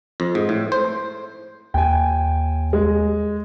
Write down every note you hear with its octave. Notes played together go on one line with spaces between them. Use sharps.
F2
G#2
A2
C5
D#2 G5 G#5
G#3